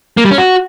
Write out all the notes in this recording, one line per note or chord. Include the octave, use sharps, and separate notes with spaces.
A#3
G3
C#4
F#4